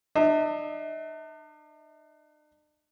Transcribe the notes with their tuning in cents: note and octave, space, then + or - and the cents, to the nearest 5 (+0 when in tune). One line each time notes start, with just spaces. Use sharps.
D4 +45 E5 -45